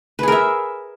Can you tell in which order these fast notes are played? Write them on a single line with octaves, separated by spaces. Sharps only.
B4 G#4 A#4 E5